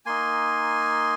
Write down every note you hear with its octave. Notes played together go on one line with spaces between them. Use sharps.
A#3 D#4 G#5 C6